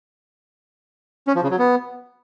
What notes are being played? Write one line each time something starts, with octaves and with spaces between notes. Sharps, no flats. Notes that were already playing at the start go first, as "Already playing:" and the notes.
C#4
F3
C#3
F#3
B3